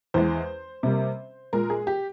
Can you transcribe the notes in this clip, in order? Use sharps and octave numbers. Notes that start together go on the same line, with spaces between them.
E2 E3 G#3 C5
C3 G3 A#3
A#2 G#3 A#4
G#4
G4